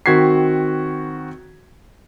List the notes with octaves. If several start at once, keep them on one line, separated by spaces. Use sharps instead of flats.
D#3 C4 F#4 G#6 B6 C7